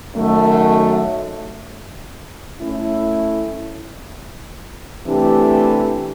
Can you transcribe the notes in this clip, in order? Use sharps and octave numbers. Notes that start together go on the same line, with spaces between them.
F#2 D#3 F#3 A3
A3 C#4 E4
C3 E3 A3 D4 G4